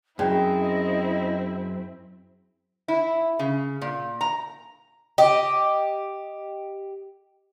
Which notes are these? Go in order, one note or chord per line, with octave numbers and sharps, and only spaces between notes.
F#2 C4 E4 G#4 D#5 G5
E4
C#3
A#2
A#5
G4 D#5